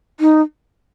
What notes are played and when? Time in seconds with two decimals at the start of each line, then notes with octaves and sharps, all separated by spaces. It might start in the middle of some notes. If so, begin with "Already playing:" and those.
0.20 D#4